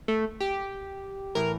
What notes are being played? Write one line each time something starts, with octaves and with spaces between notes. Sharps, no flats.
A3
G4
A2 E3 A#4